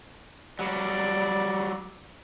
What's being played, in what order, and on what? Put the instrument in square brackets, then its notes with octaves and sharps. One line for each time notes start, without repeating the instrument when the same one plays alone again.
[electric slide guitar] F#3 G3 [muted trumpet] D5